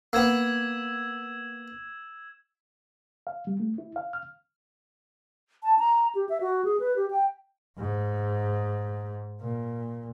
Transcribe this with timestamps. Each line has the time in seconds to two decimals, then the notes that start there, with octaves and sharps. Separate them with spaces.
0.13 A#3 B3 E6 G#6 E7
3.27 F5
3.47 G3
3.60 A3
3.78 E4
3.96 F5
4.13 F6
5.63 A5
5.79 A#5
6.15 G4
6.29 E5
6.41 F#4
6.65 G#4
6.80 B4
6.96 G4
7.10 G5
7.78 G#2
9.41 A#2